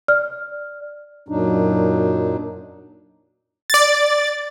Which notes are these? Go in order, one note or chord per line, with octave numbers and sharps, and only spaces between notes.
D5 F6
F#2 A#2 F#3 D4 D#4
D5 A6